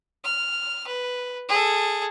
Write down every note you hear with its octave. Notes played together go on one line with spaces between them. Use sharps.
F6
B4
G#4 A4